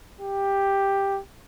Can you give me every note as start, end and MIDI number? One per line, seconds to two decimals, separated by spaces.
0.21 1.19 67